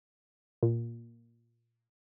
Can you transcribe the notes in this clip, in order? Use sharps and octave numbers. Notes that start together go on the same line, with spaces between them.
A#2